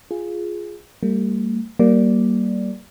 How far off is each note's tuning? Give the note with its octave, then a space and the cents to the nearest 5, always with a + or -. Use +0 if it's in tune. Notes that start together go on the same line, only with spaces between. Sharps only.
F4 +0 G#4 +0
G3 +0 A#3 -45
G3 -30 A#3 +0 D5 +0